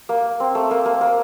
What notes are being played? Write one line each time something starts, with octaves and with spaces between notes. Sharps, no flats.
A#3
C4
A3
A#3
A#3
A#3